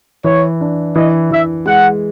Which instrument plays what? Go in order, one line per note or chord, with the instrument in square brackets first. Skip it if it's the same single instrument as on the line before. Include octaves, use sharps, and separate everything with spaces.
[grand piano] E3 [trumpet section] C#5
[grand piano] D4
[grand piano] E3 [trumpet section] D#5
[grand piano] E3 [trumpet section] E5
[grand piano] G#3 [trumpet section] F#5